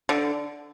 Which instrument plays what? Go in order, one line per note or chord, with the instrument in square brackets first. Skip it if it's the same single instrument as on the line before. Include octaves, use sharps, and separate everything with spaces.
[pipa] D3